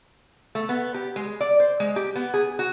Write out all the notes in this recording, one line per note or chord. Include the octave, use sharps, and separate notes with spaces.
A3
B3
G4
G#3
D5
C5
G#3
G4
B3
G#4
F#4